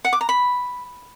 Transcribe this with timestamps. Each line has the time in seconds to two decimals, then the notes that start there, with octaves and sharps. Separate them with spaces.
0.05 F#5
0.13 D6
0.21 A#5
0.29 B5